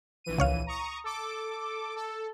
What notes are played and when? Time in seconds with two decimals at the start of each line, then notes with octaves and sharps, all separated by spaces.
0.24 A#1 E3 D#7
0.38 C#2 C#5 F5
0.67 A#5 C#6 D#6
1.04 A4 D6
1.96 A4